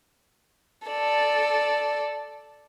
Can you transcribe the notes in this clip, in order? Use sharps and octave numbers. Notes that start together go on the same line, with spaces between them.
A4 D5